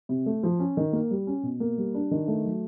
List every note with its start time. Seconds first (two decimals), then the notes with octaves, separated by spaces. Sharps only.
0.09 C3
0.26 A3
0.43 F3
0.59 C#4
0.77 D#3
0.93 A#3
1.11 G3
1.27 C#4
1.43 B2
1.60 A#3
1.78 G3
1.94 D4
2.11 D#3
2.28 A3
2.45 F#3